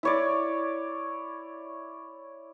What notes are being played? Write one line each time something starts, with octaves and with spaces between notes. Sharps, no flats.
E4 C#5 D5